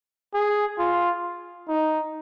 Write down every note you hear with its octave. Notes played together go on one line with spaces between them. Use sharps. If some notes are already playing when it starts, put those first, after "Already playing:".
G#4
F4
D#4